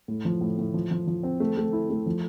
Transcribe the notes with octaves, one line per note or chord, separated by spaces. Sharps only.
A2
F3
A2
A2
F3
F3
F3
C4
A3
A3
E4
A3
F3